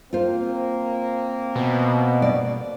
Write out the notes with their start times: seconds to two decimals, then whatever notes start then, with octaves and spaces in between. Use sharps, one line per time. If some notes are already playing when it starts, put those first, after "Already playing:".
0.13 A#3 C4 F4 C5
1.56 B2
2.22 D5